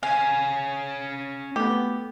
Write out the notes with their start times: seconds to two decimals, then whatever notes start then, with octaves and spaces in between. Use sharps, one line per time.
0.03 C#4 F5 G#5
1.56 A3 B3 G4